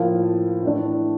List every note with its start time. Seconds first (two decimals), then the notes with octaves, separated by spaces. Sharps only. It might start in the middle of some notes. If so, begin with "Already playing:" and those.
Already playing: A2 F3 A#3
0.63 A2 E3 A3 D4